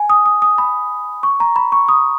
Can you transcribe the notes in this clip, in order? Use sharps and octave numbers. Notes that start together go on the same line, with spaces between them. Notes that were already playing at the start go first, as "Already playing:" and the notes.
Already playing: G#5
D#6
D#6
D#6
B5
C#6
A#5
B5
C#6
D#6